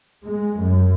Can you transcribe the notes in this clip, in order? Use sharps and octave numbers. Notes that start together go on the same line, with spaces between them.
G#3
F#2